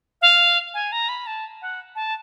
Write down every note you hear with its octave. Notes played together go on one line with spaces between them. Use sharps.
F5
G#5
A#5
B5
A5
F#5
A5